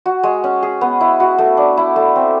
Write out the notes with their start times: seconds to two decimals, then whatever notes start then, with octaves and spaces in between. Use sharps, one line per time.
0.06 F#4
0.23 G#3
0.44 C#4
0.62 G#4
0.81 B3
1.01 E4
1.20 F#4
1.38 A3
1.57 D4
1.77 E4
1.96 A3
2.16 C4